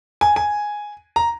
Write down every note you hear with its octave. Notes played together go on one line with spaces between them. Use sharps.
G#5
G#5
A#5